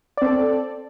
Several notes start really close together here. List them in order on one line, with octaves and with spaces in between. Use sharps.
D5 C4 A4